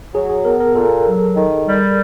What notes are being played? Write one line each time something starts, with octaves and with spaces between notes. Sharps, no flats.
F#3 G#4
G#4
B3 A#4
A#4
A#2 A4
F#3
D#3
G3